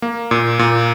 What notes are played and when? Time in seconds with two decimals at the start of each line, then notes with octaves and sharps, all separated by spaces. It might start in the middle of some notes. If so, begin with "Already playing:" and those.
0.02 A#3
0.31 A#2
0.59 A#2